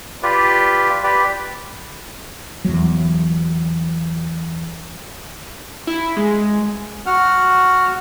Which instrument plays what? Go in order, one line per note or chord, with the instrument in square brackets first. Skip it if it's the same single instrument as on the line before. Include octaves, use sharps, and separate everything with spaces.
[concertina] F4 G4 B4 D5
G4 B4 D5
[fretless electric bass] E2 F#3
[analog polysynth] E4
G#3
[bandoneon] F#4 F#5 F6